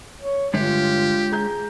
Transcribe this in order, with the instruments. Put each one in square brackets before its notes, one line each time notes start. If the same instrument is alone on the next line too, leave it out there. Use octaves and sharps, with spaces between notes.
[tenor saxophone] C#5
[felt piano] G1 [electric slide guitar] G#3 D4 C#5 [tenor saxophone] F4 [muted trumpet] G4
[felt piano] G#4 A#5 G6